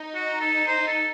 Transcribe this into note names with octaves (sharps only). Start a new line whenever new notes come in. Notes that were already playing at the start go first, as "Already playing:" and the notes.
Already playing: D#4
F#4
A4
C5
A4